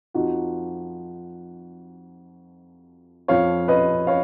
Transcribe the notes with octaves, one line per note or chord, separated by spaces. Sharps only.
F2 F3 D#4 F#4
F2 F3 C#5 F5
B4 D#5
C#5 F5